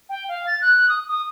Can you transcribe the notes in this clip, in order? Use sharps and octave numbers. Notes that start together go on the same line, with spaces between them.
G5
F5
A6
F#6
D#6
D#6